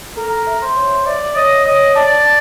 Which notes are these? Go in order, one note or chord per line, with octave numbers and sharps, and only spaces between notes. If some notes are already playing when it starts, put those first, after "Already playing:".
A4 A#4
E5
C5
C#5
D5 E5
C#5 D#5
C#5 D#5
D5 A5
A5